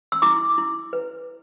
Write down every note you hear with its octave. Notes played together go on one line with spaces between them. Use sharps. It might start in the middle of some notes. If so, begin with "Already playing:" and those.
E6
E4 D6
E4
B4